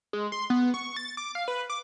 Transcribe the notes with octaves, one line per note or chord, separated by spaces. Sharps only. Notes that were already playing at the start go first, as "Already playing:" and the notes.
G#3
C6
B3
C#6
A6
D6
F5
B4
D6